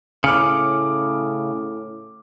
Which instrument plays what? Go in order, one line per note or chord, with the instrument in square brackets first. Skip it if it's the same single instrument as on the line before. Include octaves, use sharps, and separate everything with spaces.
[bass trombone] A2 [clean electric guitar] C#3 [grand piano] D6 F6 C#7